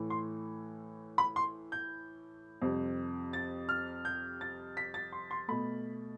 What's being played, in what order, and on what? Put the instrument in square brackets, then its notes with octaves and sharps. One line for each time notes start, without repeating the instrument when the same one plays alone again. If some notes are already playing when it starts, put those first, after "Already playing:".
Already playing: [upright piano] A2 E3 A3
C6
B5
C6
G6
F2 C3 G3
A6
F6
G6
A6
B6
A6
C6
C6
B2 A3 B5